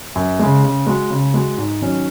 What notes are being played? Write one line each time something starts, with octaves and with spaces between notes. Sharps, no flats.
F#2
C#3 G#3
C#3
G#3 F#4
C#3
G#3 F#4
G#2
D#3 F#3 C#4